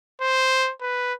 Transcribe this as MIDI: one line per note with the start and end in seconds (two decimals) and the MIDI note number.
0.21 0.71 72
0.81 1.14 71